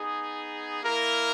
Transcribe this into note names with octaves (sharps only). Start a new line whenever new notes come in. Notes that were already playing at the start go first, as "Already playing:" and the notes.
Already playing: B3 D#4 G#4
A#3 E4 A#4